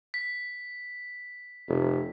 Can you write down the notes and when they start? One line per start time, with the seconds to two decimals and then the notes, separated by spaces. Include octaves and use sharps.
0.14 B6
1.68 F1